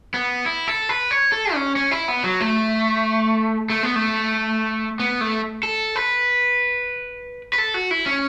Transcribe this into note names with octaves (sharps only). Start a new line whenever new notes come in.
B3
E4
A4
B4
C#5
A4
C#4
C#4
E4
B3
F#3
A3
A3
B3
A3
B3
A3
A4
B4
B4
A4
F#4
E4
C#4